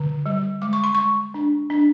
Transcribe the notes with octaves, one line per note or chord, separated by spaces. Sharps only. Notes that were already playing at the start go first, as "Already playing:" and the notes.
Already playing: D3
G3
G#3 D6
C#6
C6
G#3 C#6
D4
D4